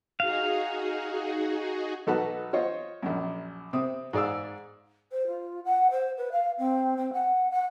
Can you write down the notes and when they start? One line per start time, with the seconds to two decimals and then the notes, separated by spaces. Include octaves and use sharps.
0.20 D#4 F#4 G#4 F5
2.07 B1 D#4 F#4 A4 B4 F#5
2.53 F4 C5 C#5 D#5
3.03 A#1 F#2
3.73 C3 C4 D#6
4.13 G#2 G#4 D5 F5 E6
5.11 C5
5.27 F4
5.65 F#5
5.91 C5
6.17 B4
6.32 F5
6.58 C4
6.97 C4
7.13 F#5
7.51 F#5